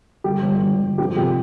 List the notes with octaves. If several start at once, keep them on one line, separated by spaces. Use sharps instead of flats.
G1 G4
G1
G1
G1
F3 G4
C3 G4